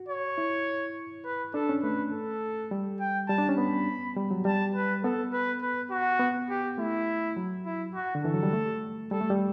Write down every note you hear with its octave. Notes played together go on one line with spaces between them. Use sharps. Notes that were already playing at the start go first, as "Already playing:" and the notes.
Already playing: F#4
C#5
E4
B4
D4 A4
C#4
A3 B4
A4
G3
G5
G3 A5
D4
C#4
B3 B5
G3
F#3
G3 A5
B4
B3 A4
B4
B4
F#4
B3
G4
A3 E4
F#3
E4
F#4
D3
E3 A4
F#3
G3
A3
G3 A4
A3
G3